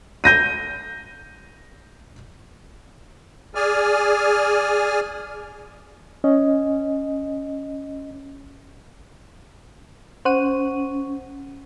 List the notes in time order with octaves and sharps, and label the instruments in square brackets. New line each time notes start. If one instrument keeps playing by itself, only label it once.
[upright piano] G6 A#6 D#7
[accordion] G#4 D5 G#5 F6
[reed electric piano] C#4 D#5
[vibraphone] C#4 [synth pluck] C5 F#5 D#7